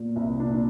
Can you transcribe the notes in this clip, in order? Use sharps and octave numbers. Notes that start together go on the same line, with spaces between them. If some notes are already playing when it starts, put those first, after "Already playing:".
Already playing: A#2
C2
A#2 D4